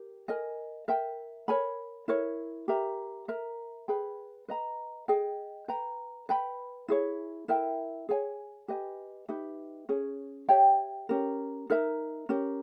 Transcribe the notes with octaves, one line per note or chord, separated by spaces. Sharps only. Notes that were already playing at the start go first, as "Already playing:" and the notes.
Already playing: G4 A#4
A#4 D#5 G#5
A#4 E5 G5
A#4 C#5 G#5 B5
E4 A#4 C#5
G4 A#4 E5 A#5
A#4 E5 A#5
G#4 B4 G5 B5
B4 D#5 A#5
G#4 D#5 G5
B4 G5 A#5
B4 G5 B5
E4 G#4 C#5
E4 A#4 E5 G5
G#4 C#5 G#5
G4 B4 D#5 G#5
D#4 G4 B4 E5
C#4 G#4 C#5
G4 C#5 E5 G5
C#4 G4 A#4
D#4 A#4 E5 A#5
C#4 G4 A#4